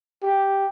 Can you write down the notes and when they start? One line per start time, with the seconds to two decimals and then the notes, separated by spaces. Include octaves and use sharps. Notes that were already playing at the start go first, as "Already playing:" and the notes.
0.22 G4